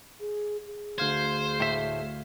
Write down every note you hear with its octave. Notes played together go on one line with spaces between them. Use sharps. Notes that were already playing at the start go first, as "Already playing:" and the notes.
G#4
G#4
D2 C5 F5 G#6
A2 E5